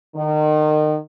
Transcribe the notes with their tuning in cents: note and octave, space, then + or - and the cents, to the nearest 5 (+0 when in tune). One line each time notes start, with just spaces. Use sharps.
D#3 -30